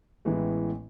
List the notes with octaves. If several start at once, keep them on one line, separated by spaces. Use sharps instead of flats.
A1 A2 E3 G#3 B3